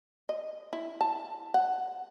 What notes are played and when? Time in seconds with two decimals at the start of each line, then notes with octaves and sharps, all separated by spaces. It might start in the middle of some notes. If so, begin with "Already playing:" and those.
0.29 D#5
0.73 E4
1.01 A5
1.54 F#5